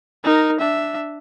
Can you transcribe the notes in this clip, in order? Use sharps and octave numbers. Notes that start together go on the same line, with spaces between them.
D#4 A#4
D4 E5